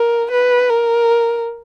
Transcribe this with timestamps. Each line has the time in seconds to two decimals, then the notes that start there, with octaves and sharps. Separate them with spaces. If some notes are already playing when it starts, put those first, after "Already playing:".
Already playing: A#4
0.31 B4
0.69 A#4